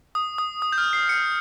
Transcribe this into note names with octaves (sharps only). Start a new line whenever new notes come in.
D#6
D#6
D#6
G6
F6
C7
C#7